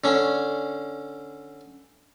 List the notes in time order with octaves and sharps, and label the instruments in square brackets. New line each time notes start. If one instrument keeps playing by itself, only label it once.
[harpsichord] D3 C#4